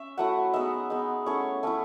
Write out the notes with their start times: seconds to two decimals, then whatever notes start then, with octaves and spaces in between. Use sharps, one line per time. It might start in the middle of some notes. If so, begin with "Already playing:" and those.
Already playing: C#4 E5
0.18 F#3 A3 E4 F#5
0.54 G#3 B3 D#4 E5
0.90 G#3 B3 D#4
1.26 A3 C#4 E4 C#5
1.63 A3 C#4 E4